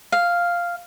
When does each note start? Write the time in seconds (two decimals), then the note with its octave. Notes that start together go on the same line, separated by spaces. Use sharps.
0.12 F5